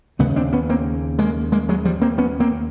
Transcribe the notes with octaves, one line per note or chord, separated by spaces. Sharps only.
D#2 C#3 A3 B3
C4 D4
B3 C#4
A#3 C4
G#3 A#3
G#3 A#3
F#3 G#3
F3 G3
A#3 C4
B3 C#4
A#3 C4